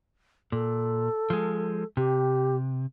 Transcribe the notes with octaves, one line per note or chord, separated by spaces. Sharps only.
A#2 A4
F3 G#3
C3 G4